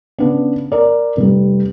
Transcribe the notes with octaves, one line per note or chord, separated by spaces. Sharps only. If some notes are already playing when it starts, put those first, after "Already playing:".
C#3 B3 D4
A#4 D5
F1 G3